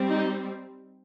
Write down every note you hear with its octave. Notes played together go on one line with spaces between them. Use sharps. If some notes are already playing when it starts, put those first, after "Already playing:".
Already playing: G3 C4
D#4